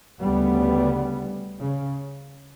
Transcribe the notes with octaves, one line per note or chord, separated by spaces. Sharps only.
D2 C#3 G3 B3
C#3